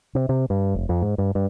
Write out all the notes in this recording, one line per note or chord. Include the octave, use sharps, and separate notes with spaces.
C3
C3
G2
F1
F2
G#2
G2
G2